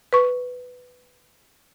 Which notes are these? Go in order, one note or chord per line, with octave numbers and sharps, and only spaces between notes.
B4 C#6